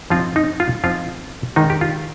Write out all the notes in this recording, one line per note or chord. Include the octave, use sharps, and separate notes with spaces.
F3 C4 D#4 F4
D#4
F4
F3 C4 D#4 F4
D#3 G#3 D4 D#4
G4
F4